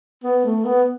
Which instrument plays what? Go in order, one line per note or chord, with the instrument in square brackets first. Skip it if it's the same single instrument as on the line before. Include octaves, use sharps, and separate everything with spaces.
[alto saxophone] B3
A3
B3